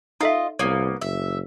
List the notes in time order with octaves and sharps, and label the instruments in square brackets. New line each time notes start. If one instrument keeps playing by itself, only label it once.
[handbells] D#4 A4 E5 [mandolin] F4 D#5
[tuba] C2 [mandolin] A#3 B3 [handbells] C#5
[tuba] F#1 [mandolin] E5